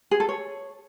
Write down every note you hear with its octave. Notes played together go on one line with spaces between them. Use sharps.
G#4
A4
C#5